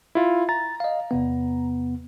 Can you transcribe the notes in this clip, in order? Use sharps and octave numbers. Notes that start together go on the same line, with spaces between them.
E4 F4
A#5 A6
D#5 F5
E2 C3 B3